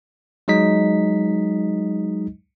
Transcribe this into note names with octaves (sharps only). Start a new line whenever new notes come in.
F#3 G#3 D#4 D#5 B6